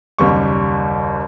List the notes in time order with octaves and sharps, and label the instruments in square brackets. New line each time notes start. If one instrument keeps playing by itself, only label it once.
[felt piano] F#1 D#2 G3 C#6